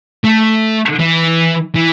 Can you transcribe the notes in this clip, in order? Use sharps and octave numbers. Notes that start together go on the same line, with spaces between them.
A3
E3
E3